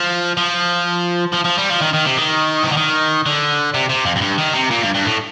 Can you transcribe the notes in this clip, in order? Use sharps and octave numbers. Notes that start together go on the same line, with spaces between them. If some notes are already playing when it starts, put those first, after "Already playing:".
Already playing: F3
F3
F3
F3
G3
F3
D#3
D#3
C3
D#3
C3
D3
D#3
D3
C3
C3
F2
F2
G2
D#3
C3
A#2
G2
G2
A2